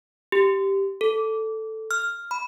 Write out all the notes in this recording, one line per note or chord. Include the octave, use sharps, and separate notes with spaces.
G4
A4
F6
B5